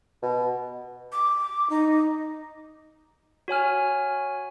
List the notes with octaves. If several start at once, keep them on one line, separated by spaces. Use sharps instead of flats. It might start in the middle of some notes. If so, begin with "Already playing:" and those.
B2
D6
D#4
F#4 C#5 G#5 F6